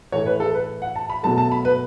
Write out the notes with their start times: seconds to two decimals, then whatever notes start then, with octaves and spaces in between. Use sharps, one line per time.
0.12 A2 E3 A3 C#5
0.26 B4
0.40 A4
0.54 B4
0.82 F#5
0.96 A5
1.10 B5
1.23 B2 F#3 A3 A5
1.38 A5
1.52 B5
1.65 B4